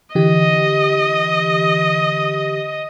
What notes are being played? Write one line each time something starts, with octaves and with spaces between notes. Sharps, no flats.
D3 E3 G4 D#5